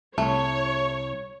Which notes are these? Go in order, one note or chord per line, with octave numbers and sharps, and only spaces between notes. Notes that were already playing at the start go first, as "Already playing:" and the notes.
C2 A3 C#5